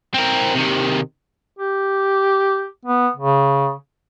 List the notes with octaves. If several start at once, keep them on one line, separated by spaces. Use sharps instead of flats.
C4 A#4
C3 D#3
G4
B3
C#3